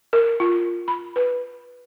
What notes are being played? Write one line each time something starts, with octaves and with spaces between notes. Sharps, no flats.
A#4
F4
B5
B4